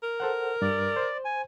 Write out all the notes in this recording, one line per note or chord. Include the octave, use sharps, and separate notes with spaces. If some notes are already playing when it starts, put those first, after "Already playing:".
A#4
A4 C5 F#5
G2 D5
C5
G#5